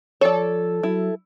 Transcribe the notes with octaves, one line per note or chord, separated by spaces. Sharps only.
F3 A4 C#5 D5
F#3 E4